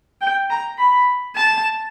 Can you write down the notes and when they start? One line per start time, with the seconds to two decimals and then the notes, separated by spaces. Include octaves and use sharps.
0.21 G5
0.50 A#5
0.79 B5
1.36 A5